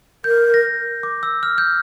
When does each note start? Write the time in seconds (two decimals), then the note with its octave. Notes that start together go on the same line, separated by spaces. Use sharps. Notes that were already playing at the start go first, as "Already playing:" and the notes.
0.24 A#4 G6
0.54 A#6
1.03 D6
1.23 E6
1.43 F6
1.58 G6